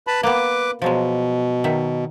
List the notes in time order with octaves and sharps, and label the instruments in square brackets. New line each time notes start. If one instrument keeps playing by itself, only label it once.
[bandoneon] B4 A5 B5
[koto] A#3 B3 [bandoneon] B4 D6
[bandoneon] B2 [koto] F3 F#3 G#3
[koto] D#3 F#3 E5